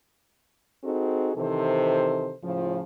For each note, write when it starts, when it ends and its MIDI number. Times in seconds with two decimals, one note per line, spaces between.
0.84 1.32 60
0.84 1.32 63
0.84 1.32 66
0.84 1.32 68
0.84 1.32 69
1.37 2.34 48
1.37 2.34 51
1.37 2.34 52
1.37 2.34 69
1.37 2.34 72
2.43 2.82 45
2.43 2.82 49
2.43 2.82 53